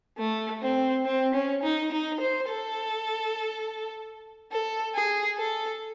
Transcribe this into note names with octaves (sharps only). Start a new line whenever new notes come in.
A3
C4
C4
C#4
D#4
D#4
C5
A4
A4
G#4
A4